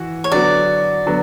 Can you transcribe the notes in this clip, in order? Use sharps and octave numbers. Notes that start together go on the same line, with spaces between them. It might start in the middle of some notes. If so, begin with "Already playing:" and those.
Already playing: E3 F#4
C#5
D3 F#3 B3 F#4 D5
D3 F#3 B3